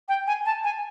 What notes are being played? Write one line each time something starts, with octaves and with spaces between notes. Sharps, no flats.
G5
G#5
A5
G#5